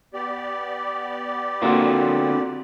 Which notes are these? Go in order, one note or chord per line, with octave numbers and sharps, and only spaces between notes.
B3 G4 D5
D3 A#3 C4 F4 F#4